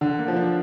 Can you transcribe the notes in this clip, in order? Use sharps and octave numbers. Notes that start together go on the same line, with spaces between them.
D3 D4
A#3
F3
D4